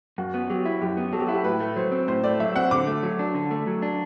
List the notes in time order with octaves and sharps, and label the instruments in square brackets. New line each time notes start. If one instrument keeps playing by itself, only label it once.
[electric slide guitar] F#2 [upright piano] F#4
[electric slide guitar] B3
[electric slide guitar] F#3 [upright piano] G4
[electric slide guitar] E4
[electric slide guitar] F#2 [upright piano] G4
[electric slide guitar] B3
[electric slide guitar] F#3 [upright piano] A4
[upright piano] G4
[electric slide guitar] E4 [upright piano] F#4
[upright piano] G4
[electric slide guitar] A2 [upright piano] B4
[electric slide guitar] A3
[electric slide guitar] F#3 [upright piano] C5
[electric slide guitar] C4
[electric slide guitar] A2 [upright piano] C5
[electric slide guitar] A3 [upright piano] D5
[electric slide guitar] F#3 [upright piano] E5
[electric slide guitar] C4 [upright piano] F#5
[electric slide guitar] D3 [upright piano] D6
[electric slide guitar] A3
F#3
D4
D3
A3
F#3
D4